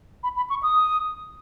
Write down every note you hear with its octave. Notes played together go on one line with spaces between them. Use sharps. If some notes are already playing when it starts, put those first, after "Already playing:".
B5
B5
C#6
D#6